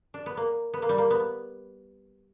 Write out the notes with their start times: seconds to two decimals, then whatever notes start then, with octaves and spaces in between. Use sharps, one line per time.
0.14 D4
0.26 B3
0.37 A#3
0.74 B3
0.82 A#3
0.89 G3
0.98 A#3
1.10 B3